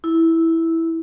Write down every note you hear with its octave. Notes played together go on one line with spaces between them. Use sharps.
E4